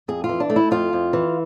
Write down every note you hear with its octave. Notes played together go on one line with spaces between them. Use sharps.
F2 G#4
F4
E3
D4
A3
E4
F2 F4
F2
E3